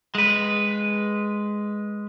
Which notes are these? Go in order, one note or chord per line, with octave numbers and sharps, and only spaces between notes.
G#3 B4